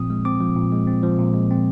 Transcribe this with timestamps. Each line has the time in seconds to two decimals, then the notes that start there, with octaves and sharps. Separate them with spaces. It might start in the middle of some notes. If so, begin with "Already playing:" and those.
Already playing: A#2 F3 C4 D#6
0.10 G#3
0.25 C4 D6
0.41 F3
0.56 A#2
0.72 G#3
0.87 C4
1.03 F3
1.18 A#2
1.34 G#3
1.51 C4